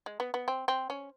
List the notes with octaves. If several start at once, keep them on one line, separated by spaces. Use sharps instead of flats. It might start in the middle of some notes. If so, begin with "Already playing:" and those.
G#3
B3
B3
C4
C4
C#4